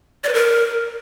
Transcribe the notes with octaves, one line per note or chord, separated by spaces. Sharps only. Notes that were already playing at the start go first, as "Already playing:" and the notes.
D5
B4
A#4